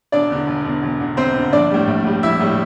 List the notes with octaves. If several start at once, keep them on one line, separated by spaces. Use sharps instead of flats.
E1 D4 D5
E2 D3
E1
E2 D3
E1
E2 D3
E1 C4 C5
E2 D3
A#1 D4 D5
A2 G3
A#1
A2 G3
A#1 E4 E5
A2 G3